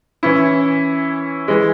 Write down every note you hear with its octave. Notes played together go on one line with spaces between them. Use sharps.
E3 C#4 E4
E3 G#3